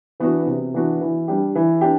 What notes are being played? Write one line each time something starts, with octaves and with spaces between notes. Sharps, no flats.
E3 B3 D4 F#4
C3
E3 B3 D4 F#4
E3
G3 D4 G4
E3
D4 G4